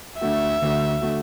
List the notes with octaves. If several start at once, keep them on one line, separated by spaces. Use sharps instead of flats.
D2 D3 A3 F#4 E5
D2 D3 A3 F#4
D3 A3 F#4